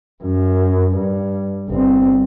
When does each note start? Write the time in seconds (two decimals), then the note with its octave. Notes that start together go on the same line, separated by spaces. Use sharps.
0.23 F#2
0.96 G2
1.68 G1 C4